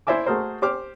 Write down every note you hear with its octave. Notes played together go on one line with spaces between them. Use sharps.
E4 C5 D5 E5 G#5 D6
A3 F#4 G#4 A#4 C5
G4 C5 D6 F6